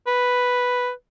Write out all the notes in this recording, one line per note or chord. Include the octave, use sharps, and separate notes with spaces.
B4